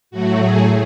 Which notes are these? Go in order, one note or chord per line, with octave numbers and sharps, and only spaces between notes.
A2 F#3 A3 F#4
G#4